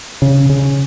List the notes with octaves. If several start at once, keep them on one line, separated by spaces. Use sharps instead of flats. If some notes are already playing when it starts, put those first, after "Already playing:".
C#3
C#3